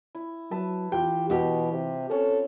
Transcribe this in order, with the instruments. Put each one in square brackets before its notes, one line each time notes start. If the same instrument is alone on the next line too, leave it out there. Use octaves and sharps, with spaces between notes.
[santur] E4
[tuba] F#3 [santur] B4 E5 A5
[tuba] E3 [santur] F4 [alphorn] G4 [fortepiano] G5
[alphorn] B2 [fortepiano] F#4 G4
[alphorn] C3
[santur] C4 C#4 [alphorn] A4